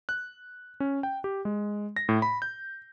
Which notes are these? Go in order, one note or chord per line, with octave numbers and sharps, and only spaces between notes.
F#6
C#4
G5
G4
G#3
A#6
A2
B5
G6